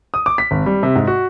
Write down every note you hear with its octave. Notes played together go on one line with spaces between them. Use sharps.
D#6
D6
B6
G#1
G3
C3
G#2
F#4